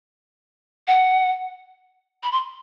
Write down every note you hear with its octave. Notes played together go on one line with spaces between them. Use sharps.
F#5
B5
C6